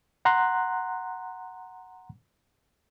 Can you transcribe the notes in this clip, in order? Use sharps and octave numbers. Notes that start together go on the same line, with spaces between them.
F#5 A#5 C6 F#6